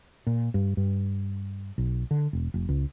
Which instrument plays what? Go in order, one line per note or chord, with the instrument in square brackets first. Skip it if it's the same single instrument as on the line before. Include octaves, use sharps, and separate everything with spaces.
[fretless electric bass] A#2
G2
G2
B1
D3
E1
F1
C#2